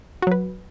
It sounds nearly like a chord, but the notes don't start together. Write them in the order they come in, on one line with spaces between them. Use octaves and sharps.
F#4 F#3 B4